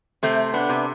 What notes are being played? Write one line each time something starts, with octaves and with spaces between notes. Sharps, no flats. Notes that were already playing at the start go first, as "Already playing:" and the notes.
C3 A3 C4
B3 D4
C3